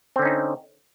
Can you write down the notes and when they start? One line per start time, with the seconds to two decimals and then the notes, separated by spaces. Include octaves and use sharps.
0.16 C4
0.19 D3
0.22 C#4
0.25 D#4